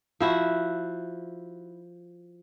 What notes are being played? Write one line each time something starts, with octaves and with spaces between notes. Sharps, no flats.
F3 E4 F#4